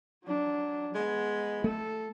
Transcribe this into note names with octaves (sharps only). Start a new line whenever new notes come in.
F#3 D4
G#3 B3 B5
A3 A4